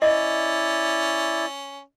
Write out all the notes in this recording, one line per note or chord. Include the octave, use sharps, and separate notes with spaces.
C#4 E4 D5 D#5